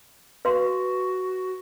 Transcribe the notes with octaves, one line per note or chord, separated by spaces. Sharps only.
F#4 B4 F5 C6